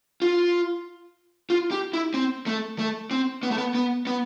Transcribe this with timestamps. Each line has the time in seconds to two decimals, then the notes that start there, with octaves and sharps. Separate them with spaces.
0.22 F4
1.50 F4
1.71 G4
1.93 E4
2.14 C4
2.46 A3
2.79 A3
3.11 C4
3.43 B3
3.51 A3
3.58 B3
3.75 B3
4.07 B3